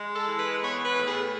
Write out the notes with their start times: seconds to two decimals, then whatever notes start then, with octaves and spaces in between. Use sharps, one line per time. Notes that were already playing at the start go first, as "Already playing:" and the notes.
Already playing: G#3
0.16 A4
0.27 E3
0.39 B4
0.62 B3 C#5
0.85 B4
0.96 A2
1.07 G#4